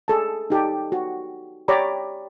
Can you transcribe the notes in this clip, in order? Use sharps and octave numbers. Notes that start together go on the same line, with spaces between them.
G#4 A4 A5
D#4 G4 A4 A5
F#4
G4 C#5 D5 A#5 B5